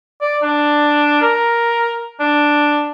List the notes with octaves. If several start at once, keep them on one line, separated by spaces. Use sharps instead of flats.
D5
D4
A#4
D4